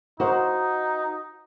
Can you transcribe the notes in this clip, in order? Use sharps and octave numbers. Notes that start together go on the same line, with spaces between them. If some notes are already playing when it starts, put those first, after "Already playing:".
D#4 F#4 C5 F5